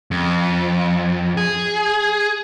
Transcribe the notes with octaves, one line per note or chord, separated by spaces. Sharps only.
F2
G#4